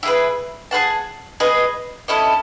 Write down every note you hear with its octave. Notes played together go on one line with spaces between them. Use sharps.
E4 G#4 B4
G#4 B4 F#5 A5
G#4 B4 D#5
C#4 E4 A4 D#5